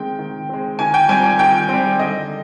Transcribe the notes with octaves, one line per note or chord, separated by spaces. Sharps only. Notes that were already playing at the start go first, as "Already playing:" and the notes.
Already playing: D#3 G#3 C4 G5
D#3
G#3 C4
D#3 G#5
G5
G3 C4 G#5
G#5
D#3 G5
G3 C4
D3 D#5